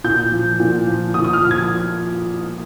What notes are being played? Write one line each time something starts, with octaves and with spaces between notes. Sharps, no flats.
A#2 G6
F3
A#2
F3
A#2 D#6
D#6
F6
F3
G#6